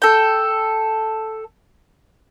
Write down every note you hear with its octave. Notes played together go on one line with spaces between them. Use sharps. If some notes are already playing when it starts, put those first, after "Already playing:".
A4 G5